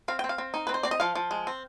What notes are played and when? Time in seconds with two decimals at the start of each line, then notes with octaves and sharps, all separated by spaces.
0.08 C4 F5
0.19 G5
0.24 C4
0.29 F5
0.38 C4
0.54 D#4
0.67 C4 B4
0.74 C5
0.83 C4 D5
0.91 D#5
1.00 F3 F5
1.15 F3
1.31 G#3
1.47 C4